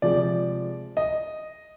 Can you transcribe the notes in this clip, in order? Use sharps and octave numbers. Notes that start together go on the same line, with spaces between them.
C3 F3 G#3 D5
D#5